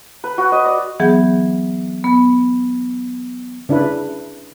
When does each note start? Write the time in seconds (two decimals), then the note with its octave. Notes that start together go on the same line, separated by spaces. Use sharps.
0.24 B4
0.38 F#4
0.52 D#5
0.66 D5
1.00 E3 F#3 B3 G#4
2.04 B3
3.69 C#3 D4 E4 B4